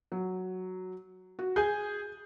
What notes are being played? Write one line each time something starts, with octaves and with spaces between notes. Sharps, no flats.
F#3
F#4
G#4 G#5 G6